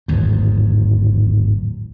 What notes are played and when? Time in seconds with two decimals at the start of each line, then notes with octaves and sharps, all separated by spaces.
0.08 D1 G#1 E2